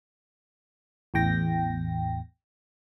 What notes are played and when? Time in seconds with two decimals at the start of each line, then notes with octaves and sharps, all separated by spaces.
1.14 A1 E2 G5 A#6